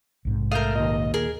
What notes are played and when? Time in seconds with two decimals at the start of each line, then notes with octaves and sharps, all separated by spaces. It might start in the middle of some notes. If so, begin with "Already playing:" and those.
0.25 A#1 G#2 C3
0.51 A3 A#4 F5 D#6 G6
0.75 D#2 A#2 D#5
1.14 G#4 A#4